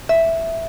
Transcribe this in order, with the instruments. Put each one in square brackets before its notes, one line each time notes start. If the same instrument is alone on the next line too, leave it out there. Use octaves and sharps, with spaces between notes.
[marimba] E5